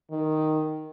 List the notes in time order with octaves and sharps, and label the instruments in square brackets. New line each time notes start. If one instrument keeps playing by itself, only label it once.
[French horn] D#3